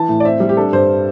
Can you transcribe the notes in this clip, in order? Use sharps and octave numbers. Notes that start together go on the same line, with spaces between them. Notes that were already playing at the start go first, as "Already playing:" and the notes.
Already playing: E3 A5
A2
D5
C4 E5
G3
G4
D4 A4
G2 C5